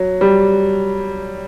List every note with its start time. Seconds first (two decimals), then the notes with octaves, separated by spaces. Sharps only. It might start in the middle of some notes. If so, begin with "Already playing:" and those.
Already playing: F#3
0.21 G3